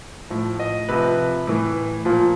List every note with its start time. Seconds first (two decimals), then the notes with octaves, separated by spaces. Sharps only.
0.30 A2 F3
0.60 D#5
0.89 C3 F3 B4
1.47 A2 E3
2.05 A#2 F3